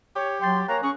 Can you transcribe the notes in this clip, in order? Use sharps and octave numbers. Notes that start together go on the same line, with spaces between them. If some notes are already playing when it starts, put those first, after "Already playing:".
G4 C#5 C#6
F#3 G5 C6 G6 A6
A#3 C#5 G#5 A#5 F#6
C#4 G#4 C#6